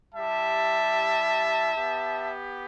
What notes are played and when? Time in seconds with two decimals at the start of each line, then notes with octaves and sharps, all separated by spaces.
0.13 G3 E4 G4 E5 A5
1.75 B3 G4